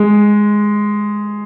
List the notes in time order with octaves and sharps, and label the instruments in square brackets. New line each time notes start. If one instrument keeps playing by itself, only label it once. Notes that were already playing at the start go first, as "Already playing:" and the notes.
Already playing: [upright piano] G#3